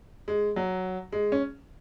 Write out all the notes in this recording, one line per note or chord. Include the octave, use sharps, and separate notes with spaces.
G#3
F#3
G#3
C#4